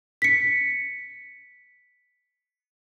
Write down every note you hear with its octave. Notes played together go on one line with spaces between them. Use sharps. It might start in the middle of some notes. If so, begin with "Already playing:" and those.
B6 C#7